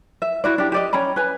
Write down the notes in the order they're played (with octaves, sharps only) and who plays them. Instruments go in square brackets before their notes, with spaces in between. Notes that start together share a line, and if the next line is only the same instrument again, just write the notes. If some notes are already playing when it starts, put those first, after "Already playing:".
[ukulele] E5
E4 F#4 D5
D4 G4
G4 D5 D#5
C#4 G5 A#5 B5
B4 G#5